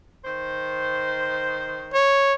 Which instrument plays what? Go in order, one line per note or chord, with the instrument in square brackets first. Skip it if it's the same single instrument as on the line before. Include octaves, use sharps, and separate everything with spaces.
[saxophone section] D#3 C5
[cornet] C#5